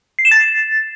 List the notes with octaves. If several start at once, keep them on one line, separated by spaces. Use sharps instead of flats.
C7
E7
A6